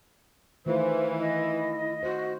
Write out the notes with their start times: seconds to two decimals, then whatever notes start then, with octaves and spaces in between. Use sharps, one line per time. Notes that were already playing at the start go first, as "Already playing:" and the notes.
0.66 D#3 E3 A3 F4 C5
1.19 E4 D#5
2.03 F#4 C5